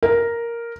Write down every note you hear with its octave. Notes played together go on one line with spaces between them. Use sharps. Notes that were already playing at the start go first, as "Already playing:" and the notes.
A#4